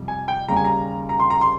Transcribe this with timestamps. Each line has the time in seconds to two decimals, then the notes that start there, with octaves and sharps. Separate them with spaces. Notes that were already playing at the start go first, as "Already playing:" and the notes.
Already playing: F2 C3 G3
0.08 G#5
0.28 G5
0.48 D#2 C#3 G3 A#5
0.56 G#5
0.65 A#5
1.09 A#5
1.20 C6
1.30 A#5
1.41 C6